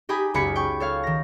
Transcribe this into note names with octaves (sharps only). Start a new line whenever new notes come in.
D#4 G4 G#4 G#5 B5 D#6
F#1 C#2 G#4 B5 B6 C#7
G5 C#6
A4 C#5 F5
D#3 A#6